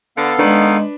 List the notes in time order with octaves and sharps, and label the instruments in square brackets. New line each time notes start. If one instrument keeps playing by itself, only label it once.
[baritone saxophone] D3 [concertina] B3 A4 F5
[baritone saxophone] D#3 [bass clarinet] G#3 [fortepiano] D4 B4 B5